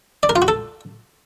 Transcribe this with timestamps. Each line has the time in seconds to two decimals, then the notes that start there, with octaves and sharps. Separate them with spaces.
0.23 D5
0.29 A#4
0.36 F4
0.42 F#4
0.48 A4